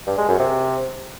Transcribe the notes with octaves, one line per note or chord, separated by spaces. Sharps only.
G2
G#3
F#2
C3